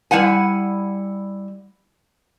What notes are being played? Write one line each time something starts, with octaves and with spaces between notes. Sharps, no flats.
G3 E4 F#5 G#5